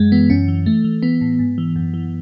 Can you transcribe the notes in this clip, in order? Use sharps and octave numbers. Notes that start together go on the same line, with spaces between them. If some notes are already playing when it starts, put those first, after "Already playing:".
Already playing: F#2 G#3
E3 B3
F#2 C#4
E3
E3 A3
E3
E3 B3
A2
G#2
E3
F#2
E3